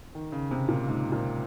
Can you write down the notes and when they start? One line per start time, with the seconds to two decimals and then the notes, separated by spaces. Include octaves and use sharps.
0.15 D#3
0.32 C#3
0.51 C3
0.69 A#2
0.88 G#2
1.12 A#2